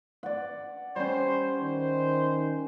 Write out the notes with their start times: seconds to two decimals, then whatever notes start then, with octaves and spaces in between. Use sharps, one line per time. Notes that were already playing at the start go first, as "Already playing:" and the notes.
0.23 D5 F#5
0.96 G3 C#4 C5
1.60 D#3 C5